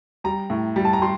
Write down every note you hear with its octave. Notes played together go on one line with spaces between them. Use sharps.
G3 A#5
A2
G3
A5
A#5
G3 C6